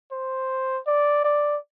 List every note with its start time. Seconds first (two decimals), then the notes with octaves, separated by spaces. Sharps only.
0.12 C5
0.87 D5
1.24 D5